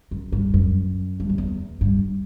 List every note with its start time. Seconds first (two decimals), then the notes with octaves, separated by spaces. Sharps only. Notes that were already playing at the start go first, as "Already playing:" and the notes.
0.11 F#2
0.32 G2
0.54 F#2
1.20 G2
1.29 F#2
1.38 E2
1.81 G2